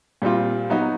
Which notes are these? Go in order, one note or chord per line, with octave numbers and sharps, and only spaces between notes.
A#2 G3 C4 F4
F#3 B3 D#4 F#4